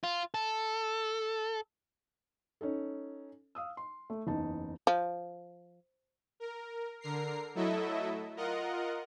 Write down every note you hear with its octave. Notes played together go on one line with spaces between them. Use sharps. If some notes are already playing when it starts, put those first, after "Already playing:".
F4
A4
C#4 D#4 A4
F5 D#6 E6
C6
A3
F#1 E2 D#4 D#5 A5
F3
A#4
D3 A#4 A#5 C7
F#3 A3 E4 A4 D#5 E5
F4 A#4 D#5 F#5